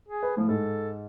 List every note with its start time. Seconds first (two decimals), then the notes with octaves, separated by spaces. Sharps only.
0.08 G#4
0.23 B4
0.37 A2 F3
0.48 G#2 A4